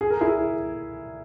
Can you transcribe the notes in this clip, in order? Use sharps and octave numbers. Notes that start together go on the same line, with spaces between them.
G#4
A#4
E4 G#4